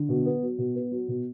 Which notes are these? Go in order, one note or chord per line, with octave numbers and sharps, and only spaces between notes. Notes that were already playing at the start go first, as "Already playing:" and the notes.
Already playing: D3
B2
B3
F#3
B2
B3
F#3
B2